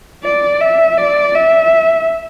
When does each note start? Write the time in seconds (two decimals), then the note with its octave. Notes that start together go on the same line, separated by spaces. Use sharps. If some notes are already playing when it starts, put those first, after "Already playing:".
0.24 D5
0.61 E5
0.97 D5
1.35 E5